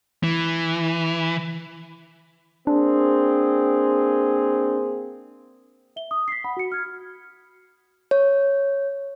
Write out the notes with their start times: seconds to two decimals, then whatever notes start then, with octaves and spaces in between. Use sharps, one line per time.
0.23 E3
2.67 A#3 C4 D4 G#4
5.96 E5 G7
6.11 D#6
6.28 B6 C7
6.44 F#5 B5
6.57 F#4 C#7
6.72 F6 G#6
8.11 C#5